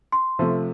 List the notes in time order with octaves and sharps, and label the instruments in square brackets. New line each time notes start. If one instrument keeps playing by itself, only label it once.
[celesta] C6
[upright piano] C3 F3 A3